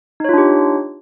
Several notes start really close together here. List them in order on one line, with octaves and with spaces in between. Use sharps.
D#4 C#5 F4 D4 G4